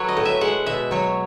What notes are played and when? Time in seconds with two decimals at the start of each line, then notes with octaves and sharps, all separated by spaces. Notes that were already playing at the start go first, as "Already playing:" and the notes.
Already playing: F#3 A4 B4 C#5
0.08 D#5
0.17 A2
0.25 E5
0.41 G#3 F#5
0.66 B2 E5
0.91 F#3 C#5